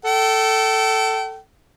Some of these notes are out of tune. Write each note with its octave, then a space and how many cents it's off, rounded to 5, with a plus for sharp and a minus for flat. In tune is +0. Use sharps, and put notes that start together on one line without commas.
A4 +5 G5 -35